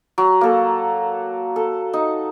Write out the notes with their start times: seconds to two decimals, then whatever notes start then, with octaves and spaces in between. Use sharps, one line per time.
0.18 F#3
0.41 A#3 A4
1.56 A4
1.93 D#4